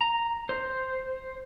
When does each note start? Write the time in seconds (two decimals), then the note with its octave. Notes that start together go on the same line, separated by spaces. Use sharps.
0.01 A#5
0.49 C5